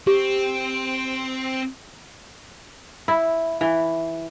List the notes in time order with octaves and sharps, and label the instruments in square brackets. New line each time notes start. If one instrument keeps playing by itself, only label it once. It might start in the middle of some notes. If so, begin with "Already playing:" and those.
[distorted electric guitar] C4 [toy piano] G4
[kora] E4
E3